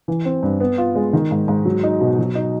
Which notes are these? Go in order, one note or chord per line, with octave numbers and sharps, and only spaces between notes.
E3
C4
G2
B3
F4
G#3
D#3
G#2
G#2
F#3
D#4
B2
F#3
D#4